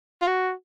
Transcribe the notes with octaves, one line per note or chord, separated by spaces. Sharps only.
F4
F#4